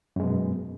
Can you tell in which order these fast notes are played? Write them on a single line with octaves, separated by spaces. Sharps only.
F#2 G#3 B2